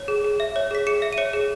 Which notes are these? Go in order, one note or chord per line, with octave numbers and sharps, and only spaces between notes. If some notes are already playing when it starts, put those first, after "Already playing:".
Already playing: C#5
G#4
G#4
E5
C#5
G#4 B6
G#4 C#7
E5
D#7
C#5 C#7
G#4